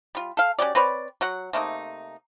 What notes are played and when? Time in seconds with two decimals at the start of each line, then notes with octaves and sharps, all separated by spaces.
0.15 G3 F4
0.37 A4 F5
0.59 C#4 F#4 G4 D5
0.75 C4 B4 C#5 D5
1.21 F#3 F#4 F#5
1.53 C3 A3 A#3 D#4